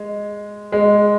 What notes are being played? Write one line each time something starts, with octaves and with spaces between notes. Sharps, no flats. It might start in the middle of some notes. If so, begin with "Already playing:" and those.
Already playing: G#3
G#3